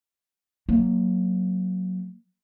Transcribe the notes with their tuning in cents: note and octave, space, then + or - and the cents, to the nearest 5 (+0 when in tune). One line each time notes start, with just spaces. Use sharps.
F#3 +0 A#3 +0